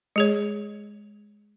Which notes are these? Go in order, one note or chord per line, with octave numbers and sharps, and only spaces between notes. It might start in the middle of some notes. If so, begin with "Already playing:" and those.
G#3 G#4 C#5